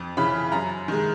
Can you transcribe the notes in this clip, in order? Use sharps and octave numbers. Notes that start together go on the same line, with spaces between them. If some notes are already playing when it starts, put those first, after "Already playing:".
Already playing: F2
C#3 E3 B5
F#2 A#5
D#3 G#3